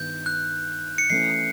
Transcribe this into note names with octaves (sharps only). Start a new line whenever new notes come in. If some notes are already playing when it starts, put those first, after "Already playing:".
Already playing: G2 D#3 B3 D#4 G6
F#6
C#7
E3 A3 C#4 C7